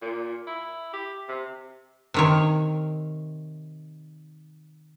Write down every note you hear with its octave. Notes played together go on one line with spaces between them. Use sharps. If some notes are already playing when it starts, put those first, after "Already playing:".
A#2
E4
G4
C3
C3 D#3 C#5